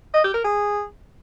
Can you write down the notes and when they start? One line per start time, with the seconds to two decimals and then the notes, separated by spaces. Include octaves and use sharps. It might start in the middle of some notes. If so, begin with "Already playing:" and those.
0.14 D#5
0.24 G4
0.34 A#4
0.44 G#4